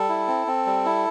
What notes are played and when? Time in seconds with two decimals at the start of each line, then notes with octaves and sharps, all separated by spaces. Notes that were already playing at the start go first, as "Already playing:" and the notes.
Already playing: G3 A4
0.09 E4
0.28 C4
0.47 C4
0.66 G3
0.85 E4